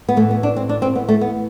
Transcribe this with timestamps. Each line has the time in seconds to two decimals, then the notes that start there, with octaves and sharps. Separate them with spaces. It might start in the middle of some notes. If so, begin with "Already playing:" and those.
0.09 B3
0.16 A2 E3 A3
0.31 B3
0.43 D4
0.57 C4
0.69 D4
0.82 C4
0.95 B3
1.09 A3
1.21 B3